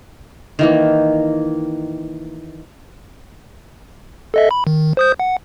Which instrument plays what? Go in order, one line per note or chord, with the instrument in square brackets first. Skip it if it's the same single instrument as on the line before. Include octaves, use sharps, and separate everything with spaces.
[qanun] D#3 E3 A#3
[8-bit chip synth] A4 D#5 E5
B5
D#3
C5 D#6 G6
F#5